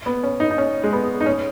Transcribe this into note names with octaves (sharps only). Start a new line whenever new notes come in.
B3
C#4
D#4
D#4
C#4
G#3
B3
D#4
C#4